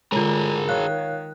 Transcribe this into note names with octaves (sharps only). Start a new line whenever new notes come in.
D3 G#3 F4 G#4 A#4
D#3 C#5 F5 F#6